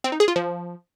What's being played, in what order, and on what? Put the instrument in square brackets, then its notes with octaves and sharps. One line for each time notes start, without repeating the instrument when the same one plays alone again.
[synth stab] C4
D#4
G#4
F4
F3